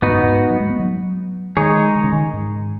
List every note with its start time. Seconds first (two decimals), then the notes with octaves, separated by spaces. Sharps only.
0.02 G#2 B3 D#4 F#4 B4
0.13 F#2
0.24 G#2
0.50 F#3
0.60 G#3
0.70 B3
0.79 F#3
1.57 D#3 G#3 D#4 G#4 C#5
1.95 D#3
2.04 C#3
2.13 D#3
2.33 G#2